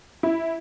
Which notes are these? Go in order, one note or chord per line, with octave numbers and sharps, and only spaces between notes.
E4